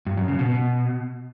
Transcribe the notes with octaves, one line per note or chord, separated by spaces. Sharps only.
G2
F#2
C#3
B2
B2